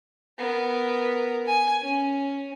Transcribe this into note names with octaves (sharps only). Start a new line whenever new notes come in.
B3 A#4
G#5
C#4